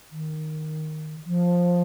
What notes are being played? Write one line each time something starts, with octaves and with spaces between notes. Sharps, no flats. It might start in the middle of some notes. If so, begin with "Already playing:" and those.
D#3
F3